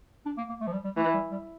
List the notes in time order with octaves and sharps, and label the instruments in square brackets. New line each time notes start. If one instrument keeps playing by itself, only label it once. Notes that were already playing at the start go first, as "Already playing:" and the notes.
[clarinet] D4
A#3
A#3
A3
F3
G3
G3
[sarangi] E3 [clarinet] A3
[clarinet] G3
G3